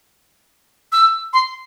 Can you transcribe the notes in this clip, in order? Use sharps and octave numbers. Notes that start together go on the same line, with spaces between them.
E6
C6